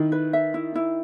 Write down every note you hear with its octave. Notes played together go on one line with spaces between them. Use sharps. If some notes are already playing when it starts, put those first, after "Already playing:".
Already playing: D#3 E4
B4
E5
E4
E4